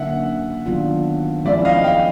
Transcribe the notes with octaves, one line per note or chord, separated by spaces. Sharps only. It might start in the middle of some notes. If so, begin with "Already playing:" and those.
Already playing: D3 F#3 A#3 C#4 E5 F#5
D#3 F#3 B3 D4 F4
F3 G#3 C#4 E4 D5 E5
D#5 F5
F5 G5